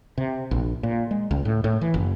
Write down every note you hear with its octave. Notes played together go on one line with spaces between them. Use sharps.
C3
A#1
A#2
G#3
C#2
A2
A2
E3
F#1